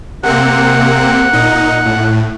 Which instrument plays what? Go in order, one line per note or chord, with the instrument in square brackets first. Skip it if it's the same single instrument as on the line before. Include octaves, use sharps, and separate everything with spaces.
[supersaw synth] C3 A#3 C4 [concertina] F#5
[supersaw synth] A#2 D#4
A2